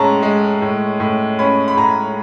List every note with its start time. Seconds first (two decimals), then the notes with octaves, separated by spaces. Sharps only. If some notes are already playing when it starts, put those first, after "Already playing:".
Already playing: A2 G#3 C#4 A5 A#5
0.22 G#3
0.62 A2
1.00 A2
1.39 C#4 B5
1.68 B5
1.77 A2 A#5